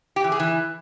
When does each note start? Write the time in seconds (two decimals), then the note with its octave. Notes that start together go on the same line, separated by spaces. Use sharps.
0.16 G4
0.24 E3
0.32 G#4
0.40 E3